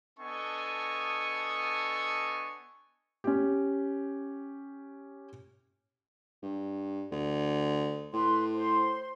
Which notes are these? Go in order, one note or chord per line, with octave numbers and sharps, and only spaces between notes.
B3 D4 A4 D#5 G#5 C#6
C#4 G4
G2
D2
A2 B4 C6
C5 C6